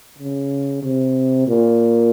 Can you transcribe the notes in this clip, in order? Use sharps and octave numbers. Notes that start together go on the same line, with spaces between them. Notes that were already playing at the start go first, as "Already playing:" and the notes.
C#3
C3
A#2